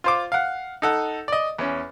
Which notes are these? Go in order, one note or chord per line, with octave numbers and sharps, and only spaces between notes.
F4 C5 D6
F5 F#5
D#4 A4 F#5
D5 D#5
E2 C#4